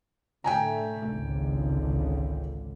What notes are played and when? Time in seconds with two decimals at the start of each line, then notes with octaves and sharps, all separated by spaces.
0.44 A2 D3 A3 G5 G#5 A#5
1.14 G#1 C#2 D3